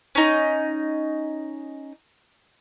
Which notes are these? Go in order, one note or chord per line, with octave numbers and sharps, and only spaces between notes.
C#4 D#4